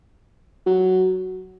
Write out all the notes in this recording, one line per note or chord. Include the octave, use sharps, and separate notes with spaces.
F#3